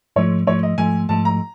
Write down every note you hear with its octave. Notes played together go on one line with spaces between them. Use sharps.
G#2 F3 A3 C#5
G#2 F3 A3 C#5
D#5
G#2 F3 A3 G#5
G#2 F3 A3 A5
A#5